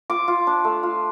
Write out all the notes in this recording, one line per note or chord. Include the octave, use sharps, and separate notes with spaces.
F4 D6
F4
D4
A3
F4